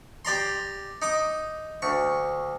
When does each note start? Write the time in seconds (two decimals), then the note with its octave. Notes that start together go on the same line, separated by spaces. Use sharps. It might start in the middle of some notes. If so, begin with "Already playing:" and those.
0.25 G4 D5 A#5 C6
1.02 D#4 D6 D#6
1.82 D2 C#6